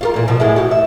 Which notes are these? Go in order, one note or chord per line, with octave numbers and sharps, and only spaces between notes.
F4 G4 A#4
E2 A#2
B2 F3
A2 G#3 E4
F#4 G4
E5